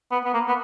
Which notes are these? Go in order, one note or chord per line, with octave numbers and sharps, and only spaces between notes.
B3
B3
A#3
B3